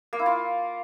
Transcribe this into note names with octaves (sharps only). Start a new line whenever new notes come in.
A#3
E4
F4